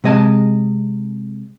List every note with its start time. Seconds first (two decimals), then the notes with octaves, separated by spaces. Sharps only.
0.04 C3 G#3 D#5 G#5 A5